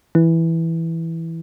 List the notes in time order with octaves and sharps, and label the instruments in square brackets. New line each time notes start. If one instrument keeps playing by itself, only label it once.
[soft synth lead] E3